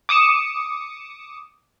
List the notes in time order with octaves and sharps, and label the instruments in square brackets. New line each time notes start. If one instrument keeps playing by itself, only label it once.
[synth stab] D6 D#6 C#7 E7